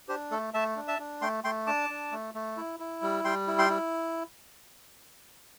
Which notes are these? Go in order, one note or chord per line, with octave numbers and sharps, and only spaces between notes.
D4 G4 C5
A3 A4
A3 E5 A5
D4
E5 A5
D4
A3 G5 C6
A3 G5 C6
D4 A5 D6
D4
A3
A3
E4
E4
G3
G3 G5 C6
E4
G5 C6
E4